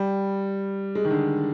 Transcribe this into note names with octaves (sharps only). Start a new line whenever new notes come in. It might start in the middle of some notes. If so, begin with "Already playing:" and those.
Already playing: G3
G#3
D#3
D3